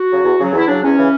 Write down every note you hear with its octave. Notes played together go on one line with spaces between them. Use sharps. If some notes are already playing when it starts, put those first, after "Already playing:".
Already playing: F#4
C#3 F#3
E2
C#3 F#3
E2 E4
C#3 F#3 D4
E2 C#4
C#3 E3